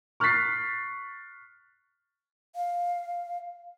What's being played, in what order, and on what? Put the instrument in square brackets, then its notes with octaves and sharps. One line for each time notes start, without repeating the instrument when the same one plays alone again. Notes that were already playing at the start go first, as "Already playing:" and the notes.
[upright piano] C#6 F6 F#6 A6 B6 C7
[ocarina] F5